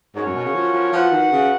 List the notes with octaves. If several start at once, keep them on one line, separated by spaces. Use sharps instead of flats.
G#2 C#4 F#4 A#4 C#5
F#2
B2
C#3
F3
F3
F3 F#4 B4 F#5
D#3
C#3